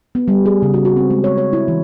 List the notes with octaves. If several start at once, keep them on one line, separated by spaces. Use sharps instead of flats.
B3
G3
G#4
C#3
F#4
F#4
C4
G#3
C#5
C#5
E4
E3